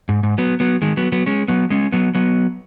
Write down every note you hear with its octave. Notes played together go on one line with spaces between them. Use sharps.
G#2
G#2
F#3 B3
F#3 B3
D#3 G#3
F#3 B3
F#3 B3
G#3 C#4
F#3 B3
G#3 C#4
F#3 B3
F#3 B3